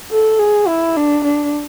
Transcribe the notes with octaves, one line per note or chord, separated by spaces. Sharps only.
A4
G#4
E4
D4
D4